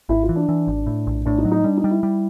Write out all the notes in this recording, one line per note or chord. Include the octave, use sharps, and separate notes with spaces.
G#1 E4
F4
E3
D4
E3
G#1
A2
A#1
A2 D4
D#4
F#3
D#4
G3 D4
D#4
G3
E4
G3